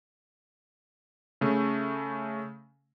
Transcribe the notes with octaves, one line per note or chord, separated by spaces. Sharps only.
C#3 A3